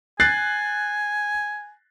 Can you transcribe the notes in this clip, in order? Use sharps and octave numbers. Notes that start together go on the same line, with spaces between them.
G#5 F#6 A6 C7